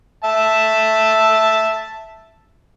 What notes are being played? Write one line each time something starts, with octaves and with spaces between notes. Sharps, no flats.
E5 A5